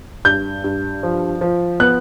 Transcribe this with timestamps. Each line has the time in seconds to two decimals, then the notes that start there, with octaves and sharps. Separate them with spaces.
0.25 G2 G6
0.64 G2
1.03 F3
1.41 F3
1.80 B3 F#6